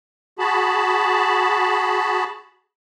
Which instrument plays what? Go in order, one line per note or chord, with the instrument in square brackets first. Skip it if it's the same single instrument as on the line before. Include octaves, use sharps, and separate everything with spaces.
[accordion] F#4 G#4 A5 B5